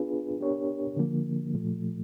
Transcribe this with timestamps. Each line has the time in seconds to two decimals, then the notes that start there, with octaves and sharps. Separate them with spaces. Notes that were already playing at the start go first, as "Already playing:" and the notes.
Already playing: B3 D4 F4 G#4 B4
0.40 B3 D4 G4 A#4 C#5
0.97 D3 F3 A#3
1.54 A#2 F3 A3